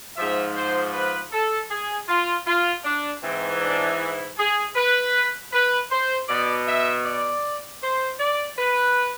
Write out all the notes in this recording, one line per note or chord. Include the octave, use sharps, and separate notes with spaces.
G#2 F3 E5
C5
B4
A4
G#4
F4
F4
D4
G#2 E3 C4
D4
E4
G#4
B4
B4
C5
B2 D5
E5
D5
C5
D5
B4